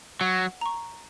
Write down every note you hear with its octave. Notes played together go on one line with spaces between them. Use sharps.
F#3 F#5
A#5 C#6